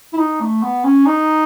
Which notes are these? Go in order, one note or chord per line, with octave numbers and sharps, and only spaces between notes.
E4
D#4
A3
B3
C#4
D#4